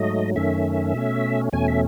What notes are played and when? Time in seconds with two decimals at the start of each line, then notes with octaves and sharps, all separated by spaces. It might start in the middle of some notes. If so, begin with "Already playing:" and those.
Already playing: G#2 F#3 A3 D#5
0.36 F#2 D#3 A3 C#4 E5
0.94 B2 A3 C#4
1.53 E2 B2 A3 C#4 G#5
1.68 E5